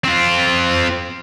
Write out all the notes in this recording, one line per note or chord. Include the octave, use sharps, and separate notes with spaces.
C4 F4